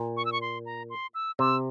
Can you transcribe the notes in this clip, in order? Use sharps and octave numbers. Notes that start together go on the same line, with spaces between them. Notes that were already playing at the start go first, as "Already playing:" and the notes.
Already playing: A#2
C#6
E6
C#6
C6
A#5
C6
E6
C3 E6